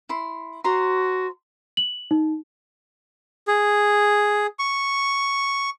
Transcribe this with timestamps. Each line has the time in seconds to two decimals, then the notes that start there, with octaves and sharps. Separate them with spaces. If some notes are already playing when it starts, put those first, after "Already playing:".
0.09 E4 C6
0.64 F#4 C5 A#5 C6
1.77 F#7
2.11 D#4
3.47 G#4
4.59 C#6